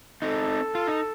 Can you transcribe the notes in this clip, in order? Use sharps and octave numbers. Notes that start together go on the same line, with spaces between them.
C4 D#4 A4
F4
D#4